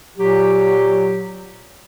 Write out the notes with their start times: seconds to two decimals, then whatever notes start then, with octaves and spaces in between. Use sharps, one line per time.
0.18 A#2 F#3 G4